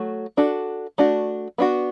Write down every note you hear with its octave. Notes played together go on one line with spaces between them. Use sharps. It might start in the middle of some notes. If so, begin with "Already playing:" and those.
Already playing: F#3 A3 F#4
D4 F#4 A4
A3 D4 F#4
B3 D4 F#4